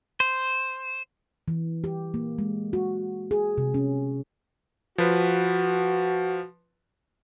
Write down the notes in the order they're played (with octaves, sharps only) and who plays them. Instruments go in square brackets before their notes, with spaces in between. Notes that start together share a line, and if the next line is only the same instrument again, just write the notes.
[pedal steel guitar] C5
[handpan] E3
G4
A#3
G#3
F#4
G#4
C3
C#4
[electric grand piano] F3 B4 [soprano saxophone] F#4